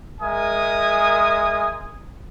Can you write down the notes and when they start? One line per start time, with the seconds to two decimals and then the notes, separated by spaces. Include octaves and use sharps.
0.21 G#3 A#4 E5 G#5 D#6